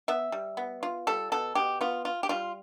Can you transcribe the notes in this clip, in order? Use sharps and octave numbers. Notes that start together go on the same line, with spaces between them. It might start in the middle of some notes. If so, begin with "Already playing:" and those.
B3 E5
G3
B3
F4
G3 A4
B2 A4
B2 G4
B3 F4
F4
G4
G3 F4